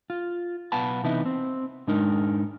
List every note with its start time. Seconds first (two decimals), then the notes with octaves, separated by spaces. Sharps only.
0.10 F4
0.72 B1 B3 F5 F#5 A5 B5
1.04 C3 E3 B3 D#4 E4
1.26 C4
1.87 G#2 G#3 D4 D#4 A#4